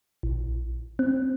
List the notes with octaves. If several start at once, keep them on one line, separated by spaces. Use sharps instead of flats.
A#1
C4